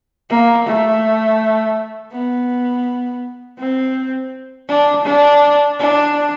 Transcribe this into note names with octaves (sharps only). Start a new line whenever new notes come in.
A#3
A3
B3
C4
D4
D4
D4